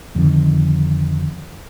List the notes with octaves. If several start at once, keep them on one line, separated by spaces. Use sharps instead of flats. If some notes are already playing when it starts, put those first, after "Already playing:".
F2 D3 D#3